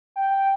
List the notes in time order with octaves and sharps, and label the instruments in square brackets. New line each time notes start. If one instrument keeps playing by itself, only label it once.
[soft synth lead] G5